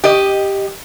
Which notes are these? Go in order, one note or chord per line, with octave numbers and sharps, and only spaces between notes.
G4 D#5